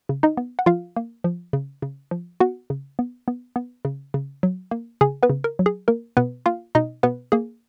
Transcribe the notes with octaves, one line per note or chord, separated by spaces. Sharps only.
C#3
D#4 D#5
B3
F#5
F3 F4 F5
A#3
F3
C#3
C#3
F3
B3 F#4 F#5
C#3
B3
B3
B3
C#3
C#3
F#3
A#3
C#3 G#4 G#5
B3 B4
C#3
A#4
F#3
G#4
A#3 A#4
B2 B3 B4
A#3 F4 F5
B2 D#4 D#5
B2 B3 B4
A#3 G#4